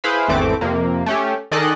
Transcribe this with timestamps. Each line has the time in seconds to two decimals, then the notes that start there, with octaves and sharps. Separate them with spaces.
0.04 E4 G#4 B4 C5 F5 B5
0.28 G#1 E2 E3 A3 C4 D6
0.61 F2 C3 A#3
1.06 A3 C#4 G4
1.51 D#3 G#4 A4 D5 D#5 F#6